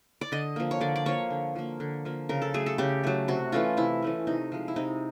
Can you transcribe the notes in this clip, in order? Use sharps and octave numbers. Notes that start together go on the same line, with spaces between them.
D5
D3 D#5
F3 A#3
C#5
D3 D5
D5
F3 A#3 C#5
D3
F3 A#3
D3
F3 A#3
C#3 A#4
A4
F#3 A3 G#4
A4
C#3 G4
F#3 A3
C3 F#4
E3 A3 C#4 F4
C3 E4
E3 A3 C#4
C3 D#4
F3 G#3
E4
C3 D#4